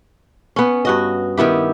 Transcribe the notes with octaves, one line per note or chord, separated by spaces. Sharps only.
B3 C#4
G2 F#4 D#5
D#3 B3 E4 G4